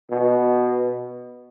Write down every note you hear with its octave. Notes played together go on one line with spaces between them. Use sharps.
B2